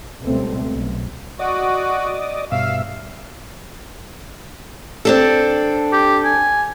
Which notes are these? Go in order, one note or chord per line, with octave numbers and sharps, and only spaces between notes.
C#2 B2 G3 A3 C4
B1
F#4 D5 D#5
G2 B2 E5 F5
C4 D4 A4
G4
G#5